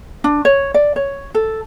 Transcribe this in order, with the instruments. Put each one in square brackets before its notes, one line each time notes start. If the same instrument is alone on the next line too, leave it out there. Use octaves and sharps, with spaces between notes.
[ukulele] D4
C#5
D5
C#5
A4